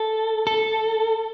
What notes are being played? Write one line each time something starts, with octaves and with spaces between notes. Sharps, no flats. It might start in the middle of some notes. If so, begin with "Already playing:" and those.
Already playing: A4
A4